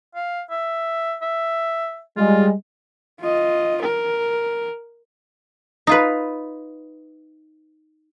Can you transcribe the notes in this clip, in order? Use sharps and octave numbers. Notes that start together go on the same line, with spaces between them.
F5
E5
E5
G3 G#3 F4
F4 D#5
A#4
D#4 F4 B4